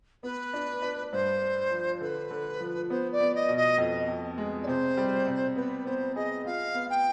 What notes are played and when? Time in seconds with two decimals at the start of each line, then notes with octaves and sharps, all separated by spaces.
0.23 B3 B4
0.53 D4
0.82 D4
1.12 G2 C5
1.42 D4
1.71 F3
2.01 D3 B4
2.31 D3
2.60 F3
2.90 B3 C5
3.12 D5
3.20 B3
3.35 D#5
3.49 B2
3.57 D#5
3.78 F2
4.08 F2
4.38 G#3
4.63 D5
4.67 C3 C5
4.97 G3
5.27 C3
5.56 B3 B4
5.85 B3 C5
6.15 G#4 D#5
6.45 F4 F5
6.74 B3
6.90 G5